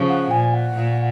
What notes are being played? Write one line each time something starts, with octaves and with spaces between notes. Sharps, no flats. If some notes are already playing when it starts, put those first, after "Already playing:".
Already playing: C#3 F3
F#5
A#2 G#5
F#5
A#2